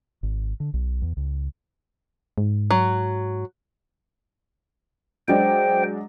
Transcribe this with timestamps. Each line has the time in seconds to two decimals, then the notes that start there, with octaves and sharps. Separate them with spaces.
0.23 G#1
0.60 D3
0.74 B1
1.02 E2
1.17 C#2
2.38 G#2
2.71 F#3
5.28 F#3 G#3 D4 C5 G5